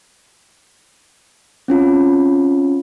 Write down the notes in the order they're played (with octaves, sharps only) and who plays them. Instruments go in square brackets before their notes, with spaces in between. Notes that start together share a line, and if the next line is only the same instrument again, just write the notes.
[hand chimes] C4 C#4 F4